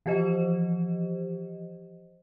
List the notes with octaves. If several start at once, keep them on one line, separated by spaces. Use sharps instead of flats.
E3 F3 G4 C5 D#5